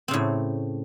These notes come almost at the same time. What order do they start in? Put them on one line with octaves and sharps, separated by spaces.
C4 C#3 A2